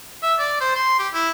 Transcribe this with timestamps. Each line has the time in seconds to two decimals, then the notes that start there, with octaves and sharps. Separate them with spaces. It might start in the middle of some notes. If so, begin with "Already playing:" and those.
0.23 E5
0.39 D5
0.61 C5
0.76 C6
0.99 G4
1.14 E4